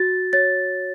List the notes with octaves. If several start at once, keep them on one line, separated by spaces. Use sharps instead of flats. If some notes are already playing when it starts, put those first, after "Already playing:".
Already playing: F#4 A6
C#5 A6